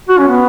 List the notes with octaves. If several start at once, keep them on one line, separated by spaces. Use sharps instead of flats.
F#4
C#4
B3